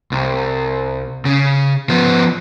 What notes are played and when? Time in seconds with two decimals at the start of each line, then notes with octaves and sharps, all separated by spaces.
0.12 C2
1.25 C#3
1.89 F3 B3